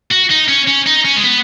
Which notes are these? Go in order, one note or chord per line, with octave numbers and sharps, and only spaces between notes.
F#4
D#4
C#4
C#4
D#4
C#4
G#3
B3